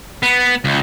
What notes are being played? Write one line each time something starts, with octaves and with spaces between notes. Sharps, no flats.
B3
C#2